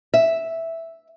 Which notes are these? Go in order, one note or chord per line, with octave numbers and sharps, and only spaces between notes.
E5